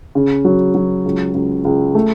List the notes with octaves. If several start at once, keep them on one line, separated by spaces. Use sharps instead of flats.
C#3
F#3
F#3
C#2
C#2
C#2
A3